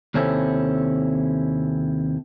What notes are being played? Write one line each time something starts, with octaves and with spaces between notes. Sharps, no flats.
D#2 C3 C4 C#4 E4 A4